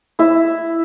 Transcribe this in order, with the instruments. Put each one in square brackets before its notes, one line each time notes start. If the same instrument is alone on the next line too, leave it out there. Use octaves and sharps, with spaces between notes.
[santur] E4 E5